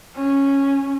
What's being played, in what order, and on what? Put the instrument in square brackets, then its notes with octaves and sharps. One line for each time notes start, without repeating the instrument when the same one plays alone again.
[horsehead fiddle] C#4